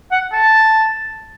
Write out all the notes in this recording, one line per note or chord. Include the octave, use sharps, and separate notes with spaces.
F#5
A5